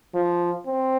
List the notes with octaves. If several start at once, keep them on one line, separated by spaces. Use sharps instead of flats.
F3
C4